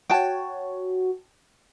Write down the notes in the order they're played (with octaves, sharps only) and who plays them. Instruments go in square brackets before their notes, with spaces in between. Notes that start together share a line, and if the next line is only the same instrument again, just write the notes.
[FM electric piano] F#4 C#5 [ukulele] G5 A5